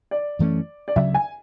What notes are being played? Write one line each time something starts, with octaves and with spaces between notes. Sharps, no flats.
D5
F#2 E3 A3 C#4
D5
D2 C#3 F#3 E5
G#5